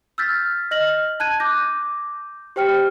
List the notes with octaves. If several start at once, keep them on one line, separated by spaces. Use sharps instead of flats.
E6 F6 G6 A6 B6
D#5 F6 A#6 F#7
A5 F#6 G#6 D#7
D6 G6 A#6
G4 C5 G5 F6 C#7